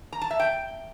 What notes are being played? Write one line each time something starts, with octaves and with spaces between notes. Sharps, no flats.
A#5
A5
E5
G5